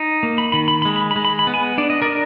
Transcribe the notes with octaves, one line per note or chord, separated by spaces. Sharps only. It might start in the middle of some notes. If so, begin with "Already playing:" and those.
Already playing: D#4
A#3
B5
D#3 B5
B5
B5
G#3
B5
B5
G#3
B5
B5
B3
G#5 B5
D4 D5
D#5
A#4 D5
D4